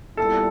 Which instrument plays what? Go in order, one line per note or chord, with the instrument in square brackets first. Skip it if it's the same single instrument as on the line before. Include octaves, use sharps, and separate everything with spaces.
[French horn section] A#2 G3 B3 E4 [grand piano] A4